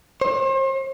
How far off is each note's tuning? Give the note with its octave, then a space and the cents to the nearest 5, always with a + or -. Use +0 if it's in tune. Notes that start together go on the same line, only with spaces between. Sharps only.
C5 +40